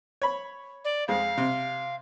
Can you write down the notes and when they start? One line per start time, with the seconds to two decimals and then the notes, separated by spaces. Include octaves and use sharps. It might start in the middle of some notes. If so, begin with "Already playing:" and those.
0.22 C#5 B5
0.85 D5
1.08 F2 G#3 F5
1.38 C3